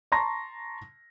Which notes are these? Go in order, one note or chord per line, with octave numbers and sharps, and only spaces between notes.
A5 A#5 C6 C#6 A#6